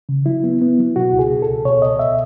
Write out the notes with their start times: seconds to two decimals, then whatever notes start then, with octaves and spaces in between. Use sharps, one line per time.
0.09 C#3
0.26 F#3 E4
0.44 B3
0.62 B3
0.79 F#3
0.96 B2 F#4
1.13 C#2
1.19 G#4
1.30 B2
1.42 C#2 A4
1.65 B2 C#5
1.82 C#2 D#5
1.99 B2 E5